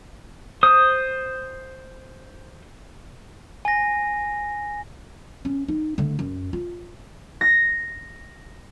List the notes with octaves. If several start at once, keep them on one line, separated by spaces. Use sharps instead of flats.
C5 D#6
G#5 A#6
C#4
D#4
D3 A3
F#2
F4
A#6